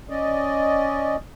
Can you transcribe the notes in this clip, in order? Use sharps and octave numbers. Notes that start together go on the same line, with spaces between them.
C#4 D5 D#5